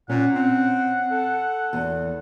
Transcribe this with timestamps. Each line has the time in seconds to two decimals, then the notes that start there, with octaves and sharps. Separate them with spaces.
0.09 A#2 C#4 F#5
0.35 C4
1.11 A4
1.73 E2